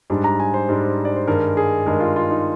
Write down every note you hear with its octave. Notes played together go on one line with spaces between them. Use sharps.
G#2 G3 D4
A#5
G#5
C5
G#2 G3 D4
D5
C5
G2 D#3 G#3 A#4
G#4
G2 D#3 G#3 A#4
F4
F4
D#4